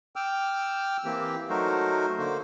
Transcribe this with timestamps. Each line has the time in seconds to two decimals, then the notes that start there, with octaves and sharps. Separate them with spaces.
0.16 G5 D6 E6 F6
1.05 E3 A#3 C4 G4
1.50 F#3 A3 D#4 F#4 A#4 C5
2.19 D3 A#3 C5